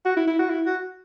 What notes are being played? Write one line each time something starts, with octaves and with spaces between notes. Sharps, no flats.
F#4
E4
E4
F#4
E4
F#4